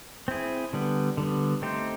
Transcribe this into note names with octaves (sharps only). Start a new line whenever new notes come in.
C4 E4 G#4
D3 G3 B3
D3 G3 B3
A3 C4 D#4 G4 C5